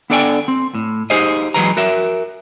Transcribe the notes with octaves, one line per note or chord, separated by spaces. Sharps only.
B3 D4 A4 D5 G5 G#5
C4
A2
D#4 G4 G#4 C5 D#5
E3 F#3 G#3 B4 A#5
F#4 A#4 E5